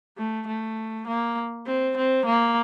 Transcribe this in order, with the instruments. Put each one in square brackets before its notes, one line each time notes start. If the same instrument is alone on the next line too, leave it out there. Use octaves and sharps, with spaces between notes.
[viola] A3
A3
A#3
C4
C4
A#3